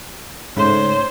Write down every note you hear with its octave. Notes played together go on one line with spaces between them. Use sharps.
G#2 C#3 A3 C5 C#5